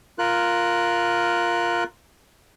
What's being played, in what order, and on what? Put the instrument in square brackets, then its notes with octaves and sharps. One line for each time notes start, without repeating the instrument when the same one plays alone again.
[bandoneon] F4 A#4 F#6